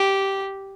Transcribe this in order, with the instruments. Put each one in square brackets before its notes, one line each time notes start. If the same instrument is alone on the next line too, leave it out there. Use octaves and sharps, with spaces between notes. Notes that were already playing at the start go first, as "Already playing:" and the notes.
Already playing: [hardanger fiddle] G4